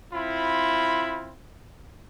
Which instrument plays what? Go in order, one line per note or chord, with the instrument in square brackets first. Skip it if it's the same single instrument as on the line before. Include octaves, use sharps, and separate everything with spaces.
[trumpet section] C4 E4 F4 B5